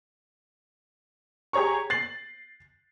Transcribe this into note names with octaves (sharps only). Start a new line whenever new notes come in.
G4 G#4 C#5 A#5 C#6
A6 C7 F#7